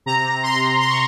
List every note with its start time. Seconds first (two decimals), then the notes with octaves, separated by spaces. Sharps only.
0.06 C3 A#5
0.24 C3
0.43 C3 C6
0.62 C3
0.81 C3 C6
0.89 C#6